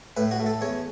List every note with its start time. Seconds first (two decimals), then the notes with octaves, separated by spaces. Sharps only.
0.17 A2 B4
0.31 F#4
0.39 A3
0.46 A4
0.61 E2 C#5